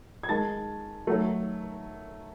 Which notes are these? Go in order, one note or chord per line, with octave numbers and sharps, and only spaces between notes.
G#6
D#3 G#3 A5 A6
D#3 F#3 A3